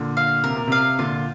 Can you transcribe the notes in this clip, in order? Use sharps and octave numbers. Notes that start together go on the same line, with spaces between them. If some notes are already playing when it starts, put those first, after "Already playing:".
Already playing: A#2 D3
F5
C3 A#4
A#2
C3 F5
A#2 D3 F4